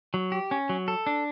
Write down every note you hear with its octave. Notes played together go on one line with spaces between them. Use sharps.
F#3
G4
C#4
F#3
A4
D4